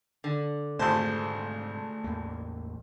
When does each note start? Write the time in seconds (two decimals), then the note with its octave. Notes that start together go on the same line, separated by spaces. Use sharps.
0.24 D3
0.79 G#1 F2 G#2 C3 A3 C5 A5
2.04 A1 E2 A#3